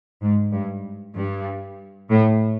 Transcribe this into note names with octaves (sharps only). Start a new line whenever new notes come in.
G#2
G2
G2
A2